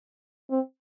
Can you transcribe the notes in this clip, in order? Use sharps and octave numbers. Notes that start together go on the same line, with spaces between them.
C4